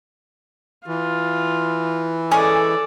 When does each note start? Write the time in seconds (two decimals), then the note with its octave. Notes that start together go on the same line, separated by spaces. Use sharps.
0.88 E3 F4
2.31 G#3 C#4 G#4 A4 D5